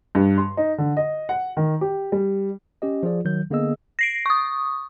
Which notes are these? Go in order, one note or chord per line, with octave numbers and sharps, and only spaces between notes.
G2
C6
D#4
D3
D#5
F#5
D#3
G4
G3
C#4 G4 D#5
F3 F4 G#4 D5
D#3 F#3 G6
D3 A#3 B3 G#4 D#5 E6
A#6 C7 D7
C#6 D#6